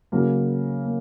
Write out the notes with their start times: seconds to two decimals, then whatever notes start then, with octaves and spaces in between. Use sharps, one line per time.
0.12 C#3 F#3 A#3
0.85 A#3